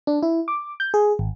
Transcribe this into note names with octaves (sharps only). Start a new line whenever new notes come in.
D4
E4
D6
G6
G#4
G#1